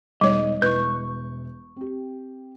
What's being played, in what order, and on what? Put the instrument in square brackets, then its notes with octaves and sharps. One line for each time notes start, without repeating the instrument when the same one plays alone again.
[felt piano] E1 G#3 D#4 [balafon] G3 C#5 [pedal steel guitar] D#5
[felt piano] E1 E4 [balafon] B4 [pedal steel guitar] C#6 G6
[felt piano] C4 G4